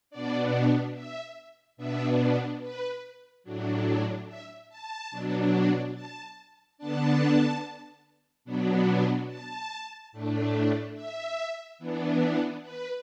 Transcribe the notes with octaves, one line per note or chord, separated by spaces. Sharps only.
B2 B3 D4 D5
E5
B2 B3 D4 E5
B4
A2 F#3 D4
E5
A5
B2 F#3 D4
A5
D3 B3 D4 A5
B2 F#3 B3 D4
A5
A2 A3 D4
E5
E3 B3 D4
B4